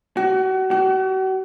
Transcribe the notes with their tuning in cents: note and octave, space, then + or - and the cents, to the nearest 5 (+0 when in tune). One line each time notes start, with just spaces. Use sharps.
F#4 +35
F#4 +40